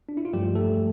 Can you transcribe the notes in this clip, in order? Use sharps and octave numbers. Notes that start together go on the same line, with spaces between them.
D4
E4
F4
G2 F3 G3 A3 G4
A3 A4